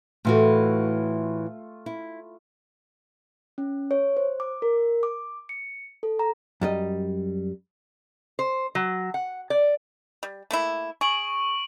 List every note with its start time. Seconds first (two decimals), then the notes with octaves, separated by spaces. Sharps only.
0.25 A2 E3 A3 F4 F#4
1.86 E4
3.58 C#4
3.91 C#5
4.17 C5
4.40 D6
4.62 A#4
5.03 D6
5.49 C#7
6.03 A4
6.19 A#5
6.61 F#2 G3 D#5
8.39 C5
8.75 F#3
9.14 F#5
9.50 D5
10.23 G3
10.51 A3 A#3 E4
11.01 G#4 C#6 D7 F#7